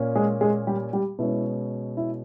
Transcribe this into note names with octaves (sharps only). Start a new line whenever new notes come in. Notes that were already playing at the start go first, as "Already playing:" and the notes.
Already playing: A#2 A#3 C#4
G#3 G#4
G#3 G#4
G3 G4
G3 G4
B2 G#3 C#4 E4
E4